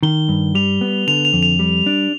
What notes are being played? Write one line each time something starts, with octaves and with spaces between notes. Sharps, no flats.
D#3 G7
G2
G3 F7
B3
D3 F7
F7
F2
F7
G3
D4